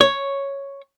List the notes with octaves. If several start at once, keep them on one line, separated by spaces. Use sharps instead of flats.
C#5